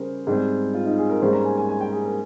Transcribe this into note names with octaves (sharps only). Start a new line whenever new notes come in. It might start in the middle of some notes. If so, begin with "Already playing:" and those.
Already playing: C#3 G3 C#4 G#4 A#4 C5
G#2 G3 C4
F4
D#4
G#4
A#4
G#2 G3 A#3 C#4 C5
A#5
G#5
G#5
G#5
G5
G#4
A#4